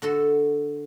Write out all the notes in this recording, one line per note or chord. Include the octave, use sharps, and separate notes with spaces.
D3 F#4 A4